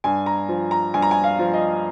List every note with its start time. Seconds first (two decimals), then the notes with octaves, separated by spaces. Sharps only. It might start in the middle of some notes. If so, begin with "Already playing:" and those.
0.04 G2 G#5
0.26 A#5
0.49 F3
0.71 A#5
0.94 G2 G#5
1.02 A#5
1.11 G#5
1.24 F5
1.39 F3
1.54 D#5